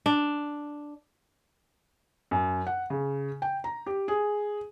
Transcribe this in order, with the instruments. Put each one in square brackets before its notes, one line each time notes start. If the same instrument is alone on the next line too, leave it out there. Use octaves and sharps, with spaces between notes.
[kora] D4
[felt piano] F#2
F#5
C#3
G5
A#5
G4
G#4